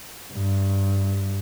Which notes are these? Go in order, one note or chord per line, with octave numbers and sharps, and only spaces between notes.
G2